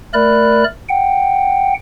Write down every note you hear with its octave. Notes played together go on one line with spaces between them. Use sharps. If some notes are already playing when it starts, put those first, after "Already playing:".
A3 A#4 D5 B5 F#6
F#5 G5